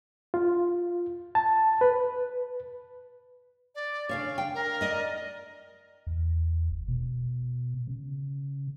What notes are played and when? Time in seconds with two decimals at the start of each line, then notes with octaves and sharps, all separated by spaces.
0.34 F4
1.35 A5
1.81 B4
3.75 D5
4.09 C#3 D4 C#5 F5
4.38 G5
4.55 A#4
4.81 D5 D#5
6.07 E2
6.71 F1
6.88 B2
7.87 C#3